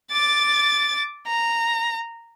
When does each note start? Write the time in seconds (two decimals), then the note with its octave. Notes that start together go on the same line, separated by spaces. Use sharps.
0.11 D6 A6
1.27 A#5